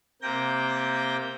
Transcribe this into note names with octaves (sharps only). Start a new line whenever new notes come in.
C3 A#3 G5 G6 A#6